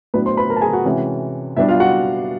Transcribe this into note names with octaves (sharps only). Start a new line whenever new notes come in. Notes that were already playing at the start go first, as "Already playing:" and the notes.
A2 F#3 B3 D4 B4 B5
C5 C6
B4 B5
A#4 A#5
A5
G#4 G#5
F#4 F#5
C3 E3 G#3 C#4
B2 G3 B3 D4 E4 E5
F4 F5
F#4 F#5